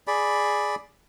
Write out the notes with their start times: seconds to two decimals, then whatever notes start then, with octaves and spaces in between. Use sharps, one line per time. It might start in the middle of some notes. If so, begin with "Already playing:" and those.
0.07 G#4 D5 B5